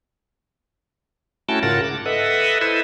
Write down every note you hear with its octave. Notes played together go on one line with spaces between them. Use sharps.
A3 C#4 E4 F#4 G5 A5
G#2 C#3 F4 A#4 F#5 A6
D6
A4 B4 D#5 E5 F#5
E4 A4 B4 C5 D#5 E5